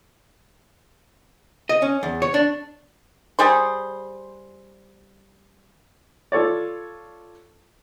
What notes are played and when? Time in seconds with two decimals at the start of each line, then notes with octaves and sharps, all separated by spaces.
1.69 D#5
1.82 C#4
2.03 E2
2.22 C#5
2.34 D4
3.39 G3 G#4 C5
6.32 F4 A4 C#5 D5